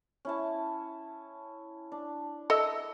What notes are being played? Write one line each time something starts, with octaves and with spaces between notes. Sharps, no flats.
C#4 E4 A5
D4
A4 D#5 E5